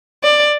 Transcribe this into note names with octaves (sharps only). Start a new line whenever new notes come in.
D5